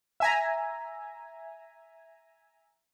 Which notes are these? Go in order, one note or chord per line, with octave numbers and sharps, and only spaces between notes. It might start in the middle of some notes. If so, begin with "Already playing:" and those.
E5 G#5 A#5